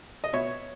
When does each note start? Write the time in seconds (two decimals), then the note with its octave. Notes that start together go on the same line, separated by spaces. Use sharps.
0.24 D#5
0.33 B2 C#5 E5